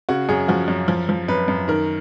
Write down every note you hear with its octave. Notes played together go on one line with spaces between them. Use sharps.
C#3 F#4
F#2 G#4
F3 F#4
F#2
F3
F3
F#2 B4
F#2
D#3 A#4